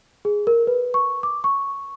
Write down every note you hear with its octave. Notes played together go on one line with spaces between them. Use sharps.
G#4
A#4
B4
C#6
D6
C#6